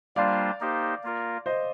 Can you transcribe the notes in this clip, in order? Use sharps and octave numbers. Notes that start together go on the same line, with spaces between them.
G3 A#3 D4 F4 C5 D5 F5
A#3 D#4 G4 C5
A#3 F4 A#4
C5 D#5